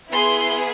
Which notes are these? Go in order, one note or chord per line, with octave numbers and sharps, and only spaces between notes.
B3 E4 G#4 C6